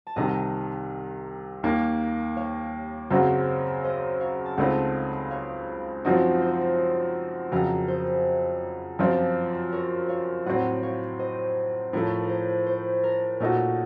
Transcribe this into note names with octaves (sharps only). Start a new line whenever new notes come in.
A5
C2 C3 D#3 D#5 F#5
D#2 D#3 A#3
C#5 F5
F#2 C#3 F#3 C4 F#4 C5
C5 D#5
C#5 F5
A5
C#2 C#3 A3 C4 D#4 D#5 F#5
C#5 F5
F#2 F3 C4 D#4 F#4
C5
F2 C#3 F#3 A#4
C5
F#2 F3 C4 F4
A#4 C#5
C#5 F5
A2 F#3 C4 D#5 F#5
C#5 F5
C5 D#5
A2 F3 A3 A#4 C#5
A#4
C5
C5
A#4
A#2 A3 D#4 F#4 A#4 C#5